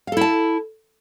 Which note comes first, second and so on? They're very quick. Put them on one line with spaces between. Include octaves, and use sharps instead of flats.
F5 A4 E4 A5